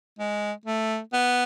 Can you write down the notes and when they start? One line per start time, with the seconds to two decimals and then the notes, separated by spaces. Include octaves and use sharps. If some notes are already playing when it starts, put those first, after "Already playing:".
0.19 G#3
0.66 A3
1.13 B3